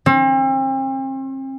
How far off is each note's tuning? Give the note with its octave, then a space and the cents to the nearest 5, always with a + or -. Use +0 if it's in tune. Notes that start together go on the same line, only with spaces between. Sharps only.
C4 +40